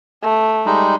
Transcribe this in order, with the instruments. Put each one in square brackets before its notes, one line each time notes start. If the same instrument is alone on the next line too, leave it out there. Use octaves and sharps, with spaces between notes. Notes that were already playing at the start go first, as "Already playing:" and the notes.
[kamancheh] A3
[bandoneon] G3 G#3 D#4